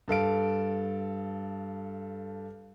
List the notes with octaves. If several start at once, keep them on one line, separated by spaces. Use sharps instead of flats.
G2 A4 F5 D7